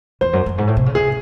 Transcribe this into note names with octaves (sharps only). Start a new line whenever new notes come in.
E2 C5
F#2
F#2
G#2
A2
C3
C#3
C3 G#4